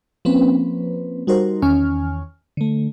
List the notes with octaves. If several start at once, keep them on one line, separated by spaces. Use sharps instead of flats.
F3 A#3 C4 C#4 B4
G3 D#4 F#4 A#4 C5
E2 D#3 C#4 G#5 C#6 F6
D3 A3